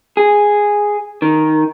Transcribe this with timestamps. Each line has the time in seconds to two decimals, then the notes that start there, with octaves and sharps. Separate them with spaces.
0.17 G#4
1.22 D#3